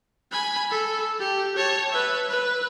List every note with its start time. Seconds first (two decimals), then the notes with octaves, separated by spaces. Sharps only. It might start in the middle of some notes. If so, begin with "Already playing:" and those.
0.32 G#5 B5
0.71 A4
1.20 G4
1.57 C#5 A5
1.92 B4 E5
2.29 B4